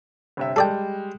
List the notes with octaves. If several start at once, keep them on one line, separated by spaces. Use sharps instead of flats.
G1 C3 E5
G3 G#3 A4 D5 G5